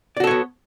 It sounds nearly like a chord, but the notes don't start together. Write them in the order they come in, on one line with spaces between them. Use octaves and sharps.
D5 F#4 A4 C#5 B3